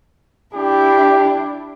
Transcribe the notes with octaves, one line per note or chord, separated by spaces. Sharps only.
D4 E4 G4